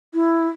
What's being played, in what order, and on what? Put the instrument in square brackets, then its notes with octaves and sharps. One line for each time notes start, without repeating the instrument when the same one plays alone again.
[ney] E4